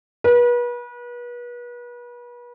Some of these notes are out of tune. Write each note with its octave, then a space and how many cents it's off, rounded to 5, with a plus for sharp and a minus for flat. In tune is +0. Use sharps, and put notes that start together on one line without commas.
B4 -35